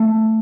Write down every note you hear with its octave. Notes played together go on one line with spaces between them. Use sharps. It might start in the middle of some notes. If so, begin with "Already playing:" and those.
Already playing: A3